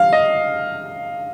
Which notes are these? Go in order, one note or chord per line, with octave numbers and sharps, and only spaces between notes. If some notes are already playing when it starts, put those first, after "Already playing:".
Already playing: F5
D#5